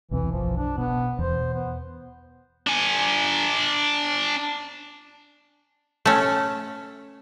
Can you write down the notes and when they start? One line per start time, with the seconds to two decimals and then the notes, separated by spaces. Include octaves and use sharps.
0.11 B1 E2 C3 E3
0.32 F#1 B1 F3
0.57 D4
0.78 B2 B3
1.19 E2 B2 C5
1.54 B3
2.67 D4 G#5
6.05 A3 C#4